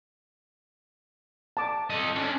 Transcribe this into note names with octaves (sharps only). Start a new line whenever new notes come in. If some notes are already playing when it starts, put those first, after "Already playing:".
A5 D6
A4 D#5
C#4 D4